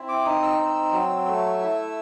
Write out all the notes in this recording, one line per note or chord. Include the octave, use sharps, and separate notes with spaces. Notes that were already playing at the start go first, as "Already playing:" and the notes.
Already playing: C4 E4
D6
D#4 D#6
E6
C4
F#3
A3
E4